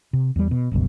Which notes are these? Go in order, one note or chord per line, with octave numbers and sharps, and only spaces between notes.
C3
E2 G3
B2
G1 C#2 F#2 B2